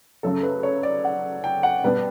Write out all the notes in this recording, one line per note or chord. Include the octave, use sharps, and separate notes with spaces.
F#2 C#3 F#3 A3 C#4 A4
B4
C#5
D5
F#5
G5
F#5
B2 G3 B3 D4 B4